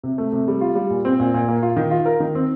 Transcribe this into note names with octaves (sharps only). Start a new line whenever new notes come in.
C3
A3
C3
G3
F4
G3
A#2
C4
A#2
A#2
A#3
F4
D#3
F4
A#4
D#3
C4